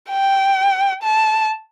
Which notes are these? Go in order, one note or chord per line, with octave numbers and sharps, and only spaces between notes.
G5
A5